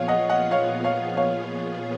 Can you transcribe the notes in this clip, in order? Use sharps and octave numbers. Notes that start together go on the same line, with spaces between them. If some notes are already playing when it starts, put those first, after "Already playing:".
Already playing: A#2 F3 B3 F4 G#4 C#5 F5
D#5 F#5
D#5 F#5
C#5 F5
C#5 F5
C#5 F5